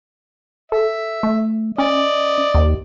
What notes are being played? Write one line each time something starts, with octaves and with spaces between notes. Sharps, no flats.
A4 E5
A3
C#4 D5 D#5
D#2